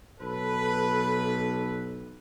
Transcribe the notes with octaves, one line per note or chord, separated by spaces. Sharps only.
B1 A4 B4